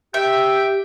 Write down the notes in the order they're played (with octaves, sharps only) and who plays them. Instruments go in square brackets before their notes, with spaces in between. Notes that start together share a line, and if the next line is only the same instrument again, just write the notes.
[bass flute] G4 [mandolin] E5 [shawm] G5